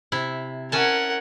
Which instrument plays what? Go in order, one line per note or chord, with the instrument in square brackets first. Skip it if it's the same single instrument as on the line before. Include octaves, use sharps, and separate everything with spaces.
[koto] C3 E4
[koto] C#4 G#5 A5 [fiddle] A#4 F#5